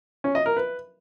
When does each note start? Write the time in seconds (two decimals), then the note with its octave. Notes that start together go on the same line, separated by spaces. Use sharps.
0.24 C#4
0.35 D#5
0.46 A#4
0.57 B4